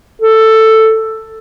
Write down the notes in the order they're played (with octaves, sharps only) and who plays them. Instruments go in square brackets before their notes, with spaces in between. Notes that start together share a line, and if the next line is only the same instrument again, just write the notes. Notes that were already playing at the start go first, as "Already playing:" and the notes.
[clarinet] A4